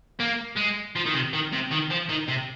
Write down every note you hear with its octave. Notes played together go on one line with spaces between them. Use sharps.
A#3
G#3
F3
D#3
C3
D#3
C3
D#3
F3
D#3
C3